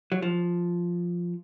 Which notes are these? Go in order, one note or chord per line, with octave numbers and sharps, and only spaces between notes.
F#3
F3